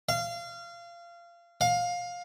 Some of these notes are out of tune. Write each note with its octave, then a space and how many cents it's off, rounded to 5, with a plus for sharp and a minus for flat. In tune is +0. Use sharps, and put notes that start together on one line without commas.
F5 -25
F5 +20